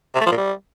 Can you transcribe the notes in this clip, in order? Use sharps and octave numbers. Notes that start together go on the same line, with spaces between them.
C3
A3
F3
A#2
G3